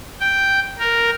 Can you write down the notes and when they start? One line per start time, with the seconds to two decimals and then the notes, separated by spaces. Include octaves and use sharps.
0.20 G5
0.79 A#4